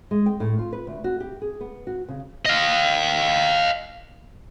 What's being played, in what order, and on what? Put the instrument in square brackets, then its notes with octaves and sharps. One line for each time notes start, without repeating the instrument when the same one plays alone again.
[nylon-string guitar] G#3
G5
A2
F4
B4
D2
F#4
G4
G#4
B3
F#4
C#3
[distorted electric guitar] D#5 F5